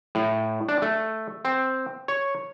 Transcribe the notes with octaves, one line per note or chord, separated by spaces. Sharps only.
A2
D4
A3
C4
C#5